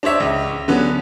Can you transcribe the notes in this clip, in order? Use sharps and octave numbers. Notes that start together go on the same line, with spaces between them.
D4 C5 C#5 E5 D6
C#2
D3 F#3 B3 C#4